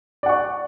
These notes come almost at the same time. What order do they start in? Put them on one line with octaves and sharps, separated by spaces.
D5 F#5 C#6